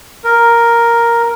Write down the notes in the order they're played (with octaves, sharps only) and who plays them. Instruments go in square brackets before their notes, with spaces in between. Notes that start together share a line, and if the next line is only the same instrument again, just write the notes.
[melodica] A#4